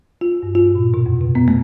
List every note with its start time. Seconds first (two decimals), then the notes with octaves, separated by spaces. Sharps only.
0.21 F4
0.43 G2
0.55 F4
0.75 A#2
0.94 B2
1.06 F2
1.21 C3
1.35 B3
1.48 A3